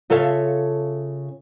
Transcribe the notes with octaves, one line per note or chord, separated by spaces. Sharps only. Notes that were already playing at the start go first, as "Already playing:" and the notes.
C#3 F4 A4 C#5 E5 F5